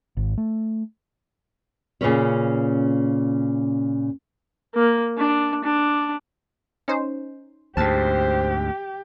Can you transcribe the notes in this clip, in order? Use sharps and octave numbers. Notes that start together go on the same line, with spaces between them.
G#1
A3
A#2 C#3 E3 C#4 B4 C#5
A#3
D4
D4
C#4 D#4 C5
D2 G#2 G4 C5 A5 A6